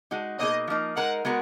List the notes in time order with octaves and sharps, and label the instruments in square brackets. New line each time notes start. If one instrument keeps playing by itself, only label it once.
[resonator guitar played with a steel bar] G#3 D#4 F#4
[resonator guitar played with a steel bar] B2 A#3 D#4 G#4 [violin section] D#5
[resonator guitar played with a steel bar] F3 A#3 D#4
[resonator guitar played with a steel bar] G#3 D#4 A#4 [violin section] F#5
[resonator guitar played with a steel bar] G#3 B3 F#4 A#4